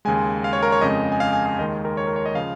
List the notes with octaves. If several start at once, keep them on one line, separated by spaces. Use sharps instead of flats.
D#2 C#3 G#3 G#5
F5
C#5
A#4
C#5
F2 C#3 G#3 D#5
G#5
F5
G#5
F5
D#2 D#3 G#3 D#5
A#4
C#5
A#4
C#5
D#5
C#3 F3 F5